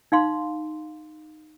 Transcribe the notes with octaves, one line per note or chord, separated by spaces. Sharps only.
D#4 F5 C6